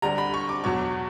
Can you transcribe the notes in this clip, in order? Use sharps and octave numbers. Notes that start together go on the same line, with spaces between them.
D2 D3 G3 A#5
B5
C#6
D6
E2 B2 F#3 C#6